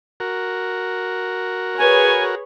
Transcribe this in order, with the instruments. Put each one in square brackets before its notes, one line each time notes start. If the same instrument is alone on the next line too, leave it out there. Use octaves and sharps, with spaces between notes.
[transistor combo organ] F#4 A#4
[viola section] G#4 B4 C#5 [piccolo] G#5